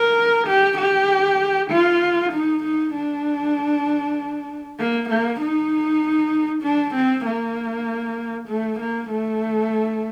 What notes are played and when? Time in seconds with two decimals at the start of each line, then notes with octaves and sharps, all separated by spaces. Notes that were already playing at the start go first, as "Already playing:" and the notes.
Already playing: A#4
0.48 G4
0.79 G4
1.71 F4
2.32 D#4
2.63 D#4
2.94 D4
4.79 A#3
5.09 A#3
5.40 D#4
6.63 D4
6.95 C4
7.25 A#3
8.48 A3
8.80 A#3
9.10 A3